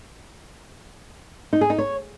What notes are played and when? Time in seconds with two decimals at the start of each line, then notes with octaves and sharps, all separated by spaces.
1.53 D#4
1.61 G#4
1.70 D#4
1.78 C#5